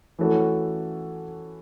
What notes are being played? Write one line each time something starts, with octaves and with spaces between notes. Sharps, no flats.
E3 A3 C#4 F#4 A4